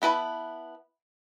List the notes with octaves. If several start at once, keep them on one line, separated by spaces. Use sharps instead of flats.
B3 E4 B4 A5